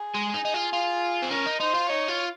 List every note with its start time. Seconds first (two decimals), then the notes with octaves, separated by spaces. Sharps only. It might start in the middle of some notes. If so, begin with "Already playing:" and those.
Already playing: G#4
0.14 G#3
0.34 D#4
0.45 D#4
0.54 F4
0.73 F4
1.22 C4
1.31 C#4 A#4
1.46 D#4
1.60 D#4 C5
1.75 F4
1.89 D#4 C#5
2.09 F4